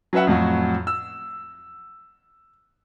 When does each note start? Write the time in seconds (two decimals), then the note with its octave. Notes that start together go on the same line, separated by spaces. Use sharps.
0.13 F#3 C#4 B4 E5 F#5
0.27 F2 A2 F#3 F#4
0.87 E6